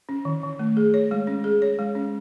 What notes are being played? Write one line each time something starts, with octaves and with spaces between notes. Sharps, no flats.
C#4
D#3
D#3
A3
G#4
C#5
G#3
C#4
G#4
C#5
G#3
C#4